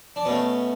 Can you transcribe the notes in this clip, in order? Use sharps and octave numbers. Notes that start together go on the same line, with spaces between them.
D4
B2 A3 C#4